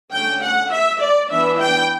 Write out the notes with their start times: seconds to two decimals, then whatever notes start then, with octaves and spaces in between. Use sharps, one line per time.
0.12 D3 A3 C#4 G5
0.41 F#5
0.71 E5
1.00 D5
1.30 E3 B3 D4 E5
1.59 G5